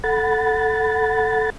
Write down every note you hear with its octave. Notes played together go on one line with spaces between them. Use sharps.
A4 F#5 B5 A6